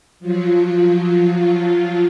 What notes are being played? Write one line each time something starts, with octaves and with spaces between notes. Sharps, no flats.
F3 F#3 F4